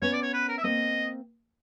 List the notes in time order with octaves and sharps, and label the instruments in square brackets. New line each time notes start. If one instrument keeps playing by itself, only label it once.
[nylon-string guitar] B3 C#4 [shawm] C#5
[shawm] D5
C#5
B4
A#4
E5
[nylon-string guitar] A#3 C4 [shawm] D#5